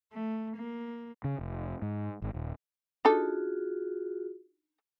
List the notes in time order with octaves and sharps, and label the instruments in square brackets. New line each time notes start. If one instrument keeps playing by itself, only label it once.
[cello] A3
A#3
[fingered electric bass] C#3
F1
G#2
G#1
D#1
[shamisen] D4 D#4 A4 [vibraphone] F4 F#4 G#4